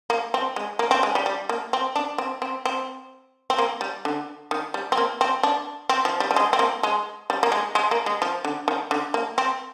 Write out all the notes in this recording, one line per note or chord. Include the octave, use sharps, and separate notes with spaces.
A#3
C4
G#3
A#3
C4
G#3
G3
G3
A#3
C4
D4
C4
C4
C4
C4
A#3
G3
D3
D#3
G3
C4
A#3
C4
D4
C4
F3
G3
G3
G#3
C4
A#3
G#3
G3
A#3
G#3
G#3
A#3
G#3
F3
D3
D#3
D3
A#3
C4